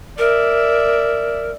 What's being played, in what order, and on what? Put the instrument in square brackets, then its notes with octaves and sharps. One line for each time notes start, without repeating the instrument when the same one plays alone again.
[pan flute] A#4 [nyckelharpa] D5 E5